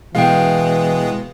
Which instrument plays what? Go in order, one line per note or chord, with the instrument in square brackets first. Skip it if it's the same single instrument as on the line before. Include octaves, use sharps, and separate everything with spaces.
[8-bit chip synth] B2 G#3 B3 [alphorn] E3 [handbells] F5 G5